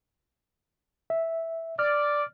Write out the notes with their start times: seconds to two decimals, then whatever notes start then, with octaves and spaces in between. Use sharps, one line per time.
1.10 E5
1.79 D5 F6